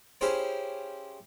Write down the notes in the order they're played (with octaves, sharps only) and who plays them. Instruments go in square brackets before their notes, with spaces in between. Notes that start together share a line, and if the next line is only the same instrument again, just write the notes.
[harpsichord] C#4 E4 G4 G#4 C5 C#5